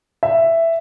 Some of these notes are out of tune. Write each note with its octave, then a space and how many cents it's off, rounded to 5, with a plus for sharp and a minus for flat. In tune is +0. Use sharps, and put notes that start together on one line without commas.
E5 +5